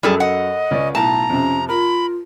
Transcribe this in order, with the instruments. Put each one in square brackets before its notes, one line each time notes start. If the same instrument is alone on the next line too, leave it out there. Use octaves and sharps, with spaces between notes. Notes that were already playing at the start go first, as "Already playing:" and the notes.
[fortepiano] F#2 F#3 [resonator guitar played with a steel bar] G3 G#4 A4
[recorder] D#5 [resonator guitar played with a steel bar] F#5
[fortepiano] C#2 C#4 D5
[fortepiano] B1 A2 [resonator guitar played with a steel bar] A5 [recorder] A#5
[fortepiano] F2 C3 [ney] C#4
[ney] F4 [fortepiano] A#4 [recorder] B5